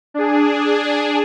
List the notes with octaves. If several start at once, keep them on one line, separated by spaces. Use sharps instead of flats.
D4 G#4